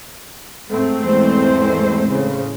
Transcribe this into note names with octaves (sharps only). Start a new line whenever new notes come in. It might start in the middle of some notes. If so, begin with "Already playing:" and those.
G#2 A3 C4
E2 G#3 C5
A2 C#3